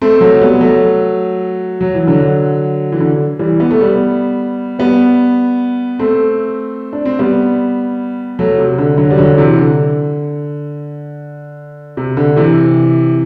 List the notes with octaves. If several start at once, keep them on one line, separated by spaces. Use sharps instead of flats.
A3 C4
F#3 A3
G3 B3
F#3 A3
F#3
E3
D3 F#3
E3
D3
E3 G3
B3
A3
G3 B3
G3 B3
A3 C4
D4
C4
G3 B3
F#3 A3
C3
D3
D3 F#3
G3
D3 F#3
C3 E3
D3
C3
D3
C3 E3